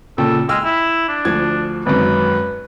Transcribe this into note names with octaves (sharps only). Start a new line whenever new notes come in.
A#2 C#3 A4 G5
G#3 G5 E6 F6
E4
D4
D2 F3 G#6
G#1 F#2 B4